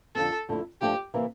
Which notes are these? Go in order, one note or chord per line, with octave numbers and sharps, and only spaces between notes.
F2 D3 F3 C4 A4
F2 D3 A3 E4
G2 F3 A3 D4 G4
C3 E3 A#3 E4